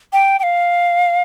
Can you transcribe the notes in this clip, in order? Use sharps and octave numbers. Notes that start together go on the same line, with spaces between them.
G5
G5
F5